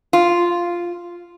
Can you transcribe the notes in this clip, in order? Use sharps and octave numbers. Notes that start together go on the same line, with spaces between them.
F4